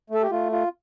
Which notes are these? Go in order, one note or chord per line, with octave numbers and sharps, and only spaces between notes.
A3 A4
G4
A3 F4
F4